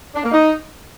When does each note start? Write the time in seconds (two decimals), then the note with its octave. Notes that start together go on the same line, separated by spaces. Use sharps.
0.15 D4
0.24 A#3
0.32 D#4